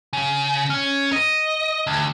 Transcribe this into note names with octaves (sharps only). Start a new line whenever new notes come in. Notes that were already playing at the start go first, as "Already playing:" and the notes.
C#3
C#4
D#5
D2